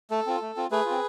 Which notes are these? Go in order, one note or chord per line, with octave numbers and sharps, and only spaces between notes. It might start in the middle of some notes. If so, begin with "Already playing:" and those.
A3 A4
C4 F4
A3
C4 F4
A3 G#4 B4
C4 F4